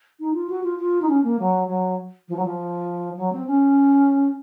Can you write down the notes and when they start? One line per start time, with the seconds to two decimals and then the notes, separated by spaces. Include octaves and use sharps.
0.20 D#4
0.34 F4
0.50 F#4
0.63 F4
0.79 F4
1.02 D#4
1.09 C#4
1.24 A#3
1.39 F#3
1.68 F#3
2.29 F3
2.37 F#3
2.45 F3
3.17 F#3
3.32 C4
3.47 C#4